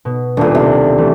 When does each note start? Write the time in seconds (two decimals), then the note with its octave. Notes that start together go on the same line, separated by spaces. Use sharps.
0.05 B2
0.37 D#1 A#2 A3 D4
0.55 C3
0.98 E3 A3